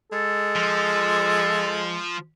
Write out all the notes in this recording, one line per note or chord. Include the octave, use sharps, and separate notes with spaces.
G#3 A4
F3